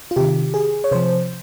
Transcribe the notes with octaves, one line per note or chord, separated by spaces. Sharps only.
F4
C3 D#3 G4
G#4
C#5
C3 F3 C5